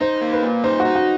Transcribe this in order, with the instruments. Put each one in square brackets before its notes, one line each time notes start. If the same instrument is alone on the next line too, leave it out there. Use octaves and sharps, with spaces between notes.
[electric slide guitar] D#4 [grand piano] C5
[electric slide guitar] A#3
[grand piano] B4
[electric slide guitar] A#2
[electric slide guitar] D#4 [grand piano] C5
[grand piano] F#4
[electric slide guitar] D#4
[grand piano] F#4